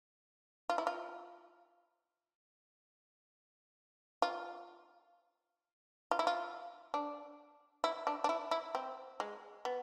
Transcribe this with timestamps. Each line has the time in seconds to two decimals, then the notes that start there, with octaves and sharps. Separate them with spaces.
0.70 F4
0.78 E4
0.87 F4
4.22 F4
6.11 F4
6.19 E4
6.27 F4
6.94 D4
7.84 E4
8.07 D4
8.24 D4
8.29 E4
8.51 E4
8.75 C4
9.20 G#3
9.65 B3